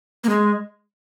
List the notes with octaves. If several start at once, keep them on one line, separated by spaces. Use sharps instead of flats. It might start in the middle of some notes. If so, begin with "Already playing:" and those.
A#3
G#3